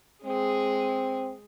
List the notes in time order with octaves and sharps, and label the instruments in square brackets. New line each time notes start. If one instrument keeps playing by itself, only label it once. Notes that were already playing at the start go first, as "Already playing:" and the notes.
[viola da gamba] G#3 G#4 [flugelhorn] C4